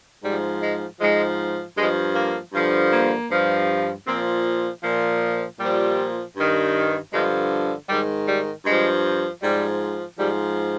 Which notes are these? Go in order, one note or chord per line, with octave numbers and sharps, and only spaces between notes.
G#2 F3 G3
G#3
G#2 F3 G#3
G2 F3 G#3
A#3
G2 D3 F3
A#3
G2 F3
A#2 F3 C4
A#2 F3
A#2 F3 G3
G2 D#3
G2 D3 F3 G#3
G#2 D#3 G3
G3
G2 F3 G#3
G#2 F3 G3
G#2 F3 G3